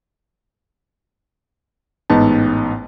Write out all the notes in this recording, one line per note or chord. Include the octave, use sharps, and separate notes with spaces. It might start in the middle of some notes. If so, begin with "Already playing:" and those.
A1 G#2 B3 D#4 A5